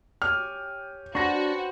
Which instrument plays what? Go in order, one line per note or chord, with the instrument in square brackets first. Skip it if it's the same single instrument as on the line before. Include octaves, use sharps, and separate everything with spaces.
[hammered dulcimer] G4 C#5 G#5 [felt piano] F6
[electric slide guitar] D4 [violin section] F#4 [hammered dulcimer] B4 C5 [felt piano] C#6 A#6